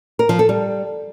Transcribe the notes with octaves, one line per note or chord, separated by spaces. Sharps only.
A#4
F3
A4
G3